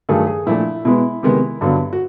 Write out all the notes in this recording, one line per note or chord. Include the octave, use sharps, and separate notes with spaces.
G2 D#3 F#3 A3 G#4
G#4
A#2 F3 A3 D4 E4
B2 G#3 B3 E4
C3 D#3 G#3 B3
G2 D3 F#3 B3
F#4